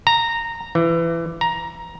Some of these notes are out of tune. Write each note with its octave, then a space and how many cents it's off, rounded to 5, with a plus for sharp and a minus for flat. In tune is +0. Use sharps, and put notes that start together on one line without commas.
A#5 -15
E3 +20
A#5 +10